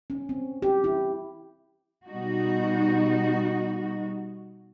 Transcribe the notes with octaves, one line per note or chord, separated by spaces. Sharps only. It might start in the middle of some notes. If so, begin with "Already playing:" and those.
C#4
C4
G4
E4
B2 G3 D#4 F#4